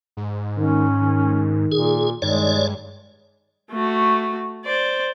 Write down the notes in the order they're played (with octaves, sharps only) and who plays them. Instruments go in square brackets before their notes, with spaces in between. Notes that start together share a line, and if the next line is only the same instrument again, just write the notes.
[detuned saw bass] G#2
[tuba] D#3 [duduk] C#4
[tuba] D#3
[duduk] A#2 [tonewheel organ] G#4
[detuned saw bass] G2 [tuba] D#3 [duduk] G#3 [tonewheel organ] C#5 D5
[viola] A3 F#4
C5 D5